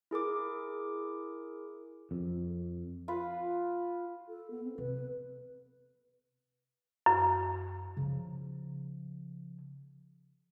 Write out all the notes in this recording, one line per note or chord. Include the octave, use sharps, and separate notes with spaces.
E4 G#4 A#4 D6
F2
F4 B4
A4
B3
C4
C3 B4
F#2
C#3 F3